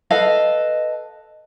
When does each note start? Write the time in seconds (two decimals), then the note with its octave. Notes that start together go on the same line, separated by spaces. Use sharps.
0.11 A4 B4 D#5 F5